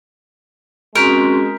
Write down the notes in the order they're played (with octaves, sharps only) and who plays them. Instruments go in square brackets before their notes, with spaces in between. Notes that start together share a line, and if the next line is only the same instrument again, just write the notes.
[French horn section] G#3 [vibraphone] C4 C#4 F#4 [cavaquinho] A#4 [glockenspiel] F6 G6 B6